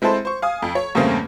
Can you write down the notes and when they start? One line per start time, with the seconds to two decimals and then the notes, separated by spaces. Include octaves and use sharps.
0.02 G#3 C4 E4 A4 C5
0.25 C5 C#6
0.42 F5 G#5 D#6
0.62 F2
0.75 C#5
0.95 E2 G2 C#3 A3 A#3 C4